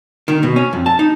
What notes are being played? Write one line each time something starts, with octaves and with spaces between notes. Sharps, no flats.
D#3
B2
C#4
F2
A5
D#4